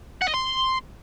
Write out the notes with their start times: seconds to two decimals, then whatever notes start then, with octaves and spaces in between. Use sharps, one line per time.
0.22 F#5
0.28 D#5
0.34 C6